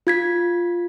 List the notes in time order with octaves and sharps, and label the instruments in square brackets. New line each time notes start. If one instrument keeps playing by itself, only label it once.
[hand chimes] F4 G#6 B6